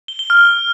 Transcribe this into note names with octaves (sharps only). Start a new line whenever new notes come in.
G7
G7
F6